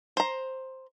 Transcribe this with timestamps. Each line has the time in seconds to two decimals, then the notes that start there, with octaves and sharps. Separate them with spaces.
0.17 C5 A#5